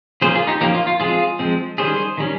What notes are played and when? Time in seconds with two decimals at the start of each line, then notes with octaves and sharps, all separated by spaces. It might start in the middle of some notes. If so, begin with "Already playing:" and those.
0.22 F3 A#3 C#4 G#4 C5
0.35 F4 G#4
0.47 D#4 G4
0.61 F3 A#3 C#4 D#4 G4
0.75 F4
0.87 F4
1.00 F3 G#3 C4 F4 G#4
1.39 F3 G#3 C4
1.78 D#3 G3 C#4 G#4 C5
2.18 D#3 G3 C#4